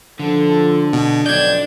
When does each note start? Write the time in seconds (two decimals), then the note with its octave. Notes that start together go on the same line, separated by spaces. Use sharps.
0.19 D3 F3 A4
0.93 B2
1.26 B1 F2 D4 D5 G6 G#6